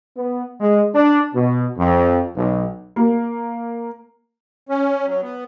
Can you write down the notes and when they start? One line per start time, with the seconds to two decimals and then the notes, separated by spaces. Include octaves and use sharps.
0.17 B3
0.60 G#3
0.95 D4
1.34 B2
1.78 F2
2.36 B1
2.96 A#3
4.69 C#4
5.06 F#3
5.22 B3